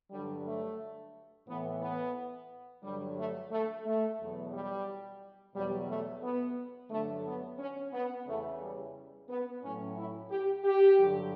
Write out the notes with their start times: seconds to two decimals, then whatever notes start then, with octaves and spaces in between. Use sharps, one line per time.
0.11 G2 D3 F#3 G3
0.45 A3
1.46 A2 E3 B3
1.81 B3
2.83 G2 D3 F#3 G3
3.17 A3
3.51 A3
3.85 A3
4.19 E2 B2 F#3
4.53 G3
5.54 E2 B2 F#3 G3
5.88 A3
6.23 B3
6.90 G2 D3 F#3 A3
7.25 B3
7.58 C#4
7.93 B3
8.27 E2 C#3 E3 A3
8.60 G3
9.29 B3
9.62 A2 F#3 C#4
9.97 E4
10.31 G4
10.64 G4
10.99 G2 D3 F#3